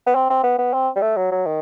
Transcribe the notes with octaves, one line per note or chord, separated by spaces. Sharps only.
B3
C4
C4
B3
B3
C4
G3
A3
F#3
F#3
D#3